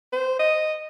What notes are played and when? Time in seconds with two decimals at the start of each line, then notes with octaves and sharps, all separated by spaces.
0.13 C5
0.39 D#5